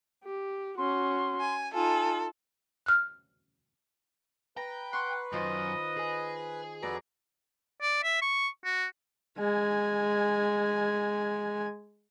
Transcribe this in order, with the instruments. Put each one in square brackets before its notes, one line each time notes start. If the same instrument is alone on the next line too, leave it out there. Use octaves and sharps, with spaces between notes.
[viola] G4
[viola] C#4 F#4 [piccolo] C6
[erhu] G#5
[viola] D#4 F4 [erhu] A4 [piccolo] G#5
[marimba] F6 F#6
[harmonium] B4 [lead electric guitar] G5 [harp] A#5
[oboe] F#5 [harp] C6 C#6
[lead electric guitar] F#2 [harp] D#3 F4 C5 [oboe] D#5
[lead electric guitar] G#4 G#5
[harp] F2 D5 A#5 [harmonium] F#4 A4 B4
[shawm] D5
E5
C#6
F#4
[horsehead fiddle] G#3 G#5